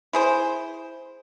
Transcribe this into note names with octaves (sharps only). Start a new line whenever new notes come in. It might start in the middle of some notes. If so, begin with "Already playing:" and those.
E4 G#4 C5